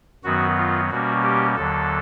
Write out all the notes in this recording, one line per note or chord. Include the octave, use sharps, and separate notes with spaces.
F#2 D#3 F#3 B3 F#4
F4
B2 G3 A#3 C#4 F#4
G4
D#2 D3 F#3 A4